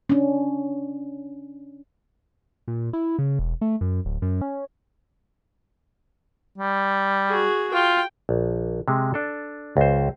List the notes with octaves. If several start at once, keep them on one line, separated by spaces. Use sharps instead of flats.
C#4 D4
A#2
E4
C#3
E1
A3
F#2
D1
F#2
C#4
G3
F#4 G#4
F4 G5
A#1
C3 G#3
D4 A4
C#2 C5